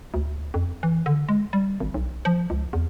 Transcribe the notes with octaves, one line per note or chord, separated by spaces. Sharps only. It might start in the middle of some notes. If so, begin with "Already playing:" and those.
D2
F2
E3
D3
G#3
G3
G#1
B1
F3
C#2
E2